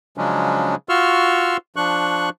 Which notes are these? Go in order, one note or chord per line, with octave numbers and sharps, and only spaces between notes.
C#3 F3 F#3 G#3 C#4 D4
F4 F#4 C6 C#6 E6 F6
F3 D4 C#6 F#6